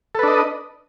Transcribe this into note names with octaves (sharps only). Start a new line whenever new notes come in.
D4 A4 B4 D#5